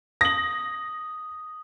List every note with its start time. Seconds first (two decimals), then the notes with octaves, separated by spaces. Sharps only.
0.21 D#6 A#6 F#7